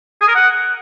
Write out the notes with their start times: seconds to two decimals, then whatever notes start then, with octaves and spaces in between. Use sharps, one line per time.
0.21 G#4
0.28 A#4
0.35 F#5